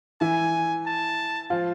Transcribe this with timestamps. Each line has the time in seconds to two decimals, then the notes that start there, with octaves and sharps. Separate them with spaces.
0.21 E3 E4 G#5
0.86 A5
1.50 F3 F4